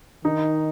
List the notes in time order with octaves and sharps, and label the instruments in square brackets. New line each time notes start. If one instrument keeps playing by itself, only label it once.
[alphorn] D#3 [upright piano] D#4